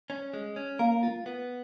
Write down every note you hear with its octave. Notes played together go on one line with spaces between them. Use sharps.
C#4
G#3
C#4
A#3 A#4
F4
B3